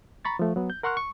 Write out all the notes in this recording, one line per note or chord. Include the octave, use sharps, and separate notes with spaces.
A#5 B5 C#6 A6
F3 A3
F#3 B3
G6
A#4 F#5 C6 C#6 F6 F#6
C#6